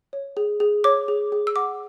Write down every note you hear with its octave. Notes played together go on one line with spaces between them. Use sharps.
C#5
G#4
G#4
C#5 D6
G#4
G#4
E6
F#5 D6